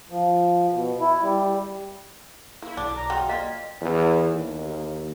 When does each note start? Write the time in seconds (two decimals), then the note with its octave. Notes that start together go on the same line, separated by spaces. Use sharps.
0.10 F3
0.73 B2
1.00 E4
1.22 G3
2.62 A#3 E4
2.77 B1 D4 D6
2.96 A#5
3.10 F#3 D#4 F4 G5
3.29 A#3 F4 D5 D#5 B6
3.81 E2
4.32 D#2